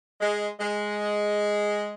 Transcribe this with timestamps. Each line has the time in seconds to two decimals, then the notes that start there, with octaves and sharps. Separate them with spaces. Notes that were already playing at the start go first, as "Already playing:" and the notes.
0.20 G#3
0.59 G#3